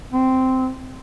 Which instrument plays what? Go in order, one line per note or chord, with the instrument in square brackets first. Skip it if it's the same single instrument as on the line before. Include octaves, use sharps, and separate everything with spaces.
[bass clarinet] C4